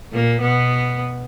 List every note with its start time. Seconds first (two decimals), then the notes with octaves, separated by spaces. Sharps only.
0.12 A#2 A#3
0.41 B2 B3